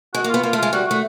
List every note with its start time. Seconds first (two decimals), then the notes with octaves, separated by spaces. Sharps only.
0.14 G#3 F#4
0.24 A#3
0.29 B3 F4
0.43 A#3 F4
0.53 A3
0.58 G#3 F4
0.73 G3 F#4
0.87 A3 F#4